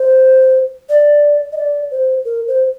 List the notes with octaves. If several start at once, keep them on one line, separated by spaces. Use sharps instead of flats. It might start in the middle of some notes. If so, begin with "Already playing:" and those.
Already playing: C5
D5
D#5
D5
C5
A#4
C5